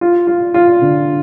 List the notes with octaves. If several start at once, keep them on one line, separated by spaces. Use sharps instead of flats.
F4
F4
F4
D3